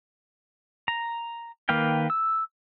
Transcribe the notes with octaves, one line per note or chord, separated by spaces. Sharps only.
A#5
D#3 A#3 B4 F5 G5
E6